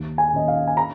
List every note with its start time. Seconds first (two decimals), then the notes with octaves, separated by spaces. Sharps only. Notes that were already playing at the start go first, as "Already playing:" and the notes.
Already playing: D#2
0.18 G#5
0.33 D#3 A#3 C#4 D#5
0.48 F5
0.67 G#5
0.77 A#5